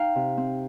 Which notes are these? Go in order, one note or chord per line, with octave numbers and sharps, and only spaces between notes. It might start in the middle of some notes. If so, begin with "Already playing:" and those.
Already playing: D#4 F5 G5 A#5
C3
C4